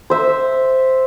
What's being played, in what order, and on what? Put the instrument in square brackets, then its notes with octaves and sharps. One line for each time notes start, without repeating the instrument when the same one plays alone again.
[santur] C5 E5